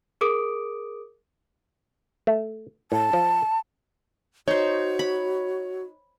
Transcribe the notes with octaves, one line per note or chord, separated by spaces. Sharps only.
G#4 A#4 D6 D#6 D7
A3
A2 A5
F3
D#4 F#4 C5 C#5
B5